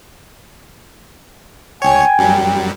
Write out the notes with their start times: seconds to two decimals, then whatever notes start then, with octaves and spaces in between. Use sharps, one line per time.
1.82 C#2 C#5 G5 G#5
2.19 F#2 F#3 G3